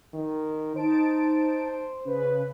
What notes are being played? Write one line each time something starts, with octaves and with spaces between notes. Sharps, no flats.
D#3
D#4 C5 A5 D7
C#3 B4